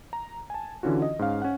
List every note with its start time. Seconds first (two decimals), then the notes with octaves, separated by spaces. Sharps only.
0.13 A#5
0.50 G#5 A5
0.83 D3 E3 C#4 F4 F#4
1.02 D#5
1.19 G#2 C#4 F5
1.42 C#4 F#5